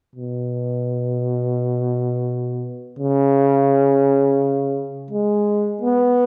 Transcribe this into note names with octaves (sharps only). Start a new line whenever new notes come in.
B2
C#3
G#3
B3